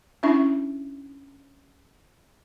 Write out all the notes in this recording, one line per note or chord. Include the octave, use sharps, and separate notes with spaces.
C#4 D4 E4 E5 C#6